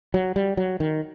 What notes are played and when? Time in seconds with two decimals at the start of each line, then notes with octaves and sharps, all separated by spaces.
0.14 F#3
0.36 G3
0.57 F#3
0.80 D#3